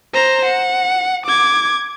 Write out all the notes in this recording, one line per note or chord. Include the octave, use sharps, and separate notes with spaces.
C5 A#5
F#5
D6 G#6